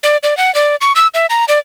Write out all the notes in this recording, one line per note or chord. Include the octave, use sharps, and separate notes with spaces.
D5
D5
F#5
D5
C#6
E6
E5
A#5
D5